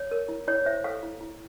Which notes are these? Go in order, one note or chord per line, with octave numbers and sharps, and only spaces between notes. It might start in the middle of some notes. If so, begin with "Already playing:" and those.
Already playing: C#5
A#4
E4
E4 C#5
C5 E5
A4 F5
E4
E4